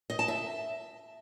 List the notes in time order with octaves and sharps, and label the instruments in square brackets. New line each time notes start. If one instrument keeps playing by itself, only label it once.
[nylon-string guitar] D#5
A5
E5